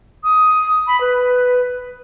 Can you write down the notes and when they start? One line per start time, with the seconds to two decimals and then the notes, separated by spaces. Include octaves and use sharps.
0.24 D#6
0.87 B5
1.01 B4